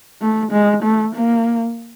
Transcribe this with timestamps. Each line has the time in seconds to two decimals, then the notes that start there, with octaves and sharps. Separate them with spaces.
0.22 A3
0.52 G#3
0.83 A3
1.15 A#3